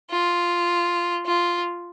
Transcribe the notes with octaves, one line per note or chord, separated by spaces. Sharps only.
F4
F4